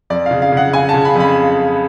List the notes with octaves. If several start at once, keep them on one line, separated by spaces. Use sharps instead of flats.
F2 D5
C#3 F5
F5
C#3 F#5
C#3 G#5
A5
C#3
B5
F2 B5